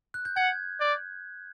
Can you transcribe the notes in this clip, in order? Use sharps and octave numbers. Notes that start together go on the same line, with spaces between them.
F#6
G6
F#5 G#6
D5